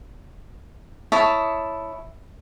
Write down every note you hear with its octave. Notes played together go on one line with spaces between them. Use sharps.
E4 C#5 A5 D#6